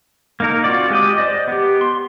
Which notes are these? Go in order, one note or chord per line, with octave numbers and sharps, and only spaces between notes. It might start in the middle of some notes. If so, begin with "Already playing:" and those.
A#3 D#4 A#4
C4 F4 F#4 D5
G#3 G4 D#5 D6
C5 D5 D#5
B3 G4
C6